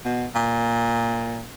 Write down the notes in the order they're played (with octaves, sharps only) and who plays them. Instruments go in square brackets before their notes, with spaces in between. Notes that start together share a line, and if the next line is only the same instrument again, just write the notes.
[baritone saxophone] B2
A#2